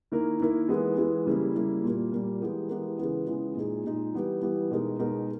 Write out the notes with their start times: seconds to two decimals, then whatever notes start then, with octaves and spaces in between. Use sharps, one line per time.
0.12 D#3 A#3 E4 A#4
0.40 D#3 A#3 E4 A#4
0.68 E3 G#3 B3
0.97 E3 G#3 B3
1.26 C#3 G3 A#3 E4
1.55 C#3 G3 A#3 E4
1.84 A#2 G3 A#3
2.12 A#2 G3 A#3
2.40 E3 G#3 B3 G4 A#4
2.69 E3 G#3 B3 G4 A#4
2.98 C#3 E3 G#3 B3
3.27 C#3 E3 G#3 B3
3.56 A#2 G#3 D#4 G#4
3.84 A#2 G#3 D#4 G#4
4.13 E3 G3 B3 G4
4.42 E3 G3 B3 G4
4.71 B2 G#3 D#4 A#4
4.99 B2 G#3 D#4 A#4